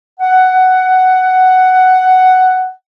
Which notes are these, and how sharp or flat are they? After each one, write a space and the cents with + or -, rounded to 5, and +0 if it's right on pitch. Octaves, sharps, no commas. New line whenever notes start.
F#5 +10